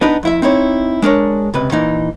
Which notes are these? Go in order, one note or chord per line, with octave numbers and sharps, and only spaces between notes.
B3 D4 D#4 B4
F2 E4 E5
C4 D#4 E4 C#5
G#3 D4 A#4 C#5
C#2 C3 B4
A#2 E3 D#4